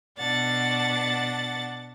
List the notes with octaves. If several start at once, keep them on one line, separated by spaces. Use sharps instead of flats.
B2 D4 F#5 A6